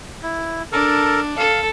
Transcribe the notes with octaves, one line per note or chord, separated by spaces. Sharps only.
E4
D4 A4 A#4
A4 F5